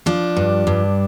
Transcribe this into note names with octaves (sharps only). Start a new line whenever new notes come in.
F3 D4
G2
G2